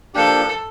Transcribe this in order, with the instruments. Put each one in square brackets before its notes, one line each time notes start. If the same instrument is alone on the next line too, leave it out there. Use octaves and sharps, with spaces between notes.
[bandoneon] F3 A#3 D4 G4 [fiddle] A4